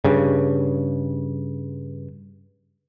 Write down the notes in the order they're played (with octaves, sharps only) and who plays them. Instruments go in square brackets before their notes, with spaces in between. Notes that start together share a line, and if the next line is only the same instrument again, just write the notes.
[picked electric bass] G2 C#3